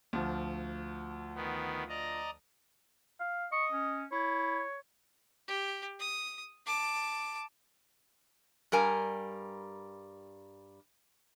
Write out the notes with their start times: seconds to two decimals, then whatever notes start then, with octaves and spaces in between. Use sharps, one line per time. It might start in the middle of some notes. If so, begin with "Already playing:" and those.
0.13 D2 F3
1.35 D#3 B3
1.89 D5 D#5 A#5
3.20 F5
3.52 D#5 C#6
3.72 C#4
4.12 E4 C#5
5.48 G4
6.00 D#6
6.66 A5 D6
8.72 G2 G3 A#4 G#5